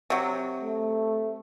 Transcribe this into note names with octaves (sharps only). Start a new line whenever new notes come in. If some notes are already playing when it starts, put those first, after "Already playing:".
C3 F#3
A3